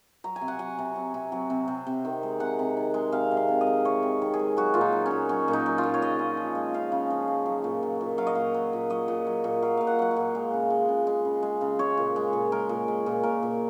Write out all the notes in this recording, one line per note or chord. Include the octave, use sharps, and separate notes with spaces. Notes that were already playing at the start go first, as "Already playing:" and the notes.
F#3 A#5
G#5
C3
F#5
F#3 G#5
C3
F#3
C3
F#3
C3
C3
C3
D#3
G#3
C3 F#5
C3
D#3
G#3
C3 F5
C3
F5
D#3
D#5
G#3
C3 C#5
C3
D#3
G#4
G#3
F#3 F#4
A#2 F4
D#4
F#3
C#4
A#2
F#3 C#4
A#2
D#4
F#3
F4
A#2
C#5
C#3 D#5
C#3
F3
G#3
C#3 F5
C#3
F3
G#3
F#3
A#2
F#3
A#2
F#3 F5
D#5
A#2 F5
F#3
A#2
F#3 D#5
A#2
F#3
A#2
F#3 F5
A#2 F5
F#5
F#3 F#5
F5
A#2
G#3
C#3
G#3
C#3
G#3
C#3
G#3
C#3
G#3 C#5
A#2
G#3
A#2
G#3 A#4
A#2
G#3
A#2
A#2 A#4
A#2